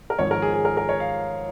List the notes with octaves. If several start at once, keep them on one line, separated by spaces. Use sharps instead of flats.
A#4
G#1 G#2 F3 C#5
A#4
G#4
G#4
A#4
A#4
C#5
F5